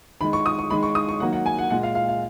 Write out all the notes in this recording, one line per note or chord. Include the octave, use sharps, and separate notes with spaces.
D#3 G#3 B5
C#6
D#6
C#6
D#3 G#3 B5
C#6
D#6
C#6
D#3 F#3 A#3 F#5
F#5
G#5
F#5
A#2 G#3 F#5
F5
F5
F5